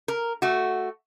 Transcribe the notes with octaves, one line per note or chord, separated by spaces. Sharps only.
A#4
A3 F#4